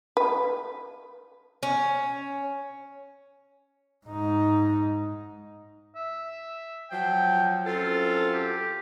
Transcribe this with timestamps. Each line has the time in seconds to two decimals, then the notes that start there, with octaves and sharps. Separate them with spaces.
0.17 B4
1.63 C#4
4.07 G#2 D#4
5.95 E5
6.90 F3 F#3 G5
7.66 F#2 C4 F4 A4
8.33 G4